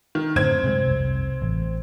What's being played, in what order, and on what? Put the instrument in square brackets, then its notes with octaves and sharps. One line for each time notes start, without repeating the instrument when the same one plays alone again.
[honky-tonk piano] D#3
[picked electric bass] F#2 A2 D3 [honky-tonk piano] C4 G#6
[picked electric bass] G2 C3 G#3
F1 C2
A1